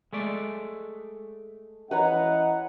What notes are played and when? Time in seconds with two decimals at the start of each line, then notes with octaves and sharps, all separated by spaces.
0.13 G#3 A3 D5
1.91 E3 C#4 B4 C#5 D#5 F#5 A#5